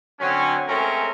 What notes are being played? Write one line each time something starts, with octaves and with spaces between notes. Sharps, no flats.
D3 F#3 C4 C#4
G#3 A3 C4 C#4 A4 A#4